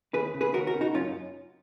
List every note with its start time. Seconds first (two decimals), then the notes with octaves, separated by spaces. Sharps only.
0.14 D#2 G#4 B4
0.34 C#3
0.41 G#4 B4
0.54 D#2 F#4 A#4
0.67 F#4 A#4
0.74 C#3
0.81 D#4 F#4
0.94 F#2 C#4 F4